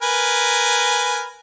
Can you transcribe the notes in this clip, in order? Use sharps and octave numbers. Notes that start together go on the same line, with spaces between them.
A#4 B4 G#5